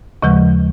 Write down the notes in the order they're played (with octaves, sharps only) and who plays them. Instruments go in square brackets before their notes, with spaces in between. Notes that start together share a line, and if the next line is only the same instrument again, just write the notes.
[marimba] D#2 C#3 F3 G#3